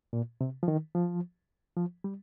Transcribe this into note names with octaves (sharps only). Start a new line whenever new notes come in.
A#2
C3
F3
D#3
F3
F3
G3